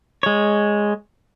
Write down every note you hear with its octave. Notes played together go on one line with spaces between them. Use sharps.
G#3 C#5